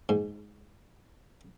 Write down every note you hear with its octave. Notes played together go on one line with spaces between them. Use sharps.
G#2